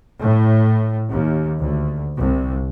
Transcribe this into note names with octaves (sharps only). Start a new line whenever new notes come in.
A2
D#2
D2
C2